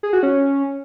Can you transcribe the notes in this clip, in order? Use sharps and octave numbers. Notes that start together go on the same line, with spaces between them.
G#4
F#4
C#4